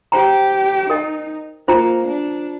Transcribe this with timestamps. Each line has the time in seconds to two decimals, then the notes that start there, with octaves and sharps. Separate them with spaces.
0.12 G4 C5 G5 A#5
0.90 D#4 A#4 D#5 G5
1.68 A#3 F4 C5 G5 A#5
2.07 D4